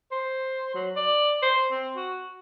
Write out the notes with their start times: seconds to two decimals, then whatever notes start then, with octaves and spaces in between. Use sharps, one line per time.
0.12 C5
0.75 F#3
0.96 D5
1.43 C5
1.71 C4
1.96 F#4